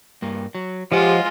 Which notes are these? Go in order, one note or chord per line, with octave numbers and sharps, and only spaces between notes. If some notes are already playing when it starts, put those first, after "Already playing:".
G2 A#3
F#3
F3 G#3 F4 G4 C#5 D#5 F#5